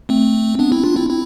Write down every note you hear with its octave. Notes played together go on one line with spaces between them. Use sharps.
A3 C4
B3 D4
C4 E4
D4 F4
C4 E4
C4 E4